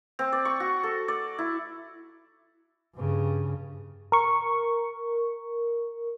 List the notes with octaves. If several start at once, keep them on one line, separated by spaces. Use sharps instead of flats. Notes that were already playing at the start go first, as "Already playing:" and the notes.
C4
D5
C#6
F#4
A4
D5
E4
G2 C#3
A#4 C#6